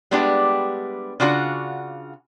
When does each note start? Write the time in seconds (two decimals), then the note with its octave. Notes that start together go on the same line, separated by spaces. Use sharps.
0.11 G3 G#3 B3 D4 E4 G4
1.20 C#3 D4 F4 F#4 G#4 F#5